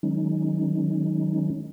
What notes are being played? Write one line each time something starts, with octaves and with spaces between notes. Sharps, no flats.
D#3 F#3 G#3 C#4 D#4